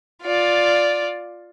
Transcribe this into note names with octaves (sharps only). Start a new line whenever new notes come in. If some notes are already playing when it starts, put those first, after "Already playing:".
F4 D5